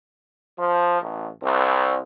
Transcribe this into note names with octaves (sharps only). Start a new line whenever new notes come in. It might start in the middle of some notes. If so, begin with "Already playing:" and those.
F3
A1
C2